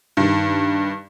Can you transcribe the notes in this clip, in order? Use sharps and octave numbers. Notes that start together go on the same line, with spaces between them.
G2 D#3